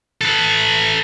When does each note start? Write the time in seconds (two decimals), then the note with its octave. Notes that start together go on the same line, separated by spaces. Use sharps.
0.21 A4 B4